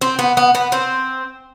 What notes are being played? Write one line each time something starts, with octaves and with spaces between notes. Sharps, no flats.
C4
B3
B3
B3
C4